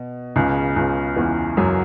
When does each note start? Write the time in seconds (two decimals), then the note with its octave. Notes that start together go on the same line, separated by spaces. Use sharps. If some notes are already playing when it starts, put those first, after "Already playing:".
Already playing: B2
0.36 C#2 C#3
0.76 C#2 C#3
1.17 E2 E3
1.57 F#2 F#3